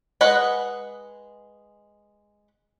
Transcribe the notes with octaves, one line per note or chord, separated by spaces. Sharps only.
G#3 B4 D#5 F#5